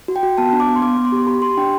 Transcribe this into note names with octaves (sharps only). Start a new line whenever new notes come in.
F#4
G5
F#4
B3 A5
D4
D6
B3
C6
B3 D6
B3
C6
G4
G4 B5
G4 C6
D4 G5